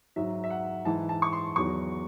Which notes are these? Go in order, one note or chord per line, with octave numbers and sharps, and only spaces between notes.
G#2 F#3 E5
E5
F#5
G#2 E3 G#3 A5
A5
C#6
C6
E2 D#3 F#3 C#6